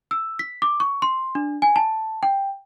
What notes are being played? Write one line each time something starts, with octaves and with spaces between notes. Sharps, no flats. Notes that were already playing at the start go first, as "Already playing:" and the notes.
E6
B6
D6
C#6
C6
D4
G#5
A5
G5